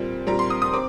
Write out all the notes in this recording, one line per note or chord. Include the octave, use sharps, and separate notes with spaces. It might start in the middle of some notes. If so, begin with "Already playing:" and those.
Already playing: A#2 G3 C4
A#2 G3 C4 A#5
C6
D#6
D#6
C4 D6